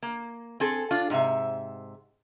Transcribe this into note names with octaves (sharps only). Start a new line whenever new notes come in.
A#3
C4 G#4 A4
D4 F4
G#2 C3 E5